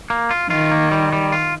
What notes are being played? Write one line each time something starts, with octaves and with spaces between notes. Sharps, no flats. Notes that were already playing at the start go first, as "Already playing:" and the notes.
A#3
F4
D#3 F4
A#3
G3
G3
F4